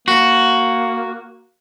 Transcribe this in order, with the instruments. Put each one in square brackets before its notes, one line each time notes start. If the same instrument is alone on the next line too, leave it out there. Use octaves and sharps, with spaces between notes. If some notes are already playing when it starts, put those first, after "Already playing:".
[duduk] A#3 [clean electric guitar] F#4